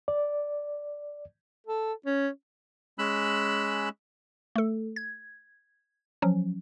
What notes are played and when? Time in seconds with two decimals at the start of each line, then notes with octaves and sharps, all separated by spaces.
0.08 D5
1.67 A4
2.06 C#4
2.99 G#3 C#4 B5 E6 F#6
4.56 A3 A4
4.96 G#6
6.22 F3 F#3 C#4